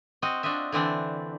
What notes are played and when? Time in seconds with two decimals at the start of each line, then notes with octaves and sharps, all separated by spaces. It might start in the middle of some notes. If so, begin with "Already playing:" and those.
0.22 C4 F#4 D#5
0.43 D4 F4 F#4 D#5 E5
0.72 D3 E3 C4 D4